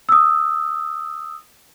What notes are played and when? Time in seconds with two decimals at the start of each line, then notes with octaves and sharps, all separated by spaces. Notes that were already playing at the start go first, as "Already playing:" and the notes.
0.09 D#6 E6